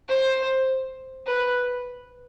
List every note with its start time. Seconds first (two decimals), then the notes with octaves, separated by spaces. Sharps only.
0.09 C5
1.27 B4